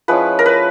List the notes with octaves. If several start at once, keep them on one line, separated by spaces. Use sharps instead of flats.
F3 G#3 C#4 E4 B4
A#4
B4